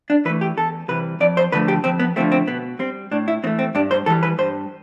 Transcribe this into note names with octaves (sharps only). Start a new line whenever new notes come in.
D4
E3 A3 B4
G4
E2 A4
C3 E3 G3 B4
F2 D5
C5
D3 F3 A3 B4
G4
F2 C4
B3
D3 F3 A3 C4
C4
B2 B3
G3 C4
A2 D4
E4
E3 A3 C4
C4
G2 D4
C5
E3 G3 A4
B4
G2 C5